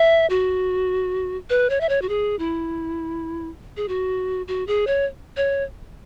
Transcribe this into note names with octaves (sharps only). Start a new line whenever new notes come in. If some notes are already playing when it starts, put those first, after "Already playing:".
Already playing: E5
F#4
B4
C#5
E5
C#5
F#4
G#4
E4
G#4
F#4
F#4
G#4
C#5
C#5